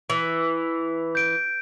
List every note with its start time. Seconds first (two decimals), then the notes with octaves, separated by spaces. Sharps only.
0.10 E3
1.15 G6 D7